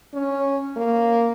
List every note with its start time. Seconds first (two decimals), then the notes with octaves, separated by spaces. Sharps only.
0.14 C#4
0.76 A#3